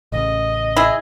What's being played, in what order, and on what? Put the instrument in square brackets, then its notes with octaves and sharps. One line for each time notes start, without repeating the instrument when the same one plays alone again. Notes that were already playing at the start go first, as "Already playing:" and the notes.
[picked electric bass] A1 C#3 [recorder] D#5
[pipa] E4 G#4